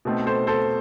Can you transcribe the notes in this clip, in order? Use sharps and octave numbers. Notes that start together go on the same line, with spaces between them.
B2 A3 C4 D#4
A4 C5
A4 C5